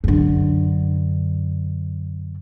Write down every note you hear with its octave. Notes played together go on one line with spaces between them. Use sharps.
F#2 D3